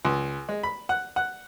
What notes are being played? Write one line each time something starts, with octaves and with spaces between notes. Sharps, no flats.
C#2
G#3
B5
F#5
F#5